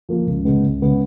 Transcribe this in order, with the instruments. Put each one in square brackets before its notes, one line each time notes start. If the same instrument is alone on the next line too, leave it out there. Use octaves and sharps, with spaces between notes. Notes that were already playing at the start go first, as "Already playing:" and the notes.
[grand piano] F3 A#3 F4
C#2
C#3 G#3 B3
C#2
C#3 G#3 B3